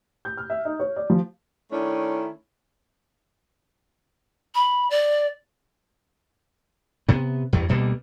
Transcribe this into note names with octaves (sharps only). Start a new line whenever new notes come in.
G6
F6
E5
D#4
C#5
D5
F3
D#3 A3 C#4 D4 E4
B5
D5
C3 B3
E2 G2
D2 B2 G3 A#3